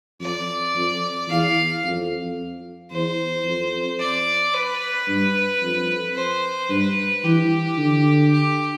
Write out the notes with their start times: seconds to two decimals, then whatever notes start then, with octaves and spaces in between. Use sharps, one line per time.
0.21 F2 D5
0.75 F2
1.29 E2 F5
1.84 F2
2.91 E2 C5
3.45 F2
4.00 D5
4.53 B4
5.08 G2
5.62 F2
6.15 C5
6.70 G2 B4
7.24 E3 G4
7.77 D3
8.32 G4